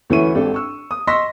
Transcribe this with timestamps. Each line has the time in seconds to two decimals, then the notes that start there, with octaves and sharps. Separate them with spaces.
0.10 D2 E3 C#4 E4 C#6 D#7
0.35 G#1 D4 G4 A4
0.54 C#6 E6
0.91 D#6
1.07 D#5 C6 C#6 E6 A#6 B6